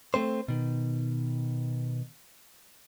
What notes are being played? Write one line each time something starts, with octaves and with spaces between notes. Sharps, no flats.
A3 C4 C5
B2 D#3